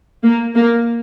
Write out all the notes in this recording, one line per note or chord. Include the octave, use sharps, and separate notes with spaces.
A#3
A#3